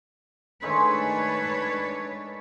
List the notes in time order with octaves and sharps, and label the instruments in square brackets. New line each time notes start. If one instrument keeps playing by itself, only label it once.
[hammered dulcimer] D#3 G#3 A3 [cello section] D4 B4 C#5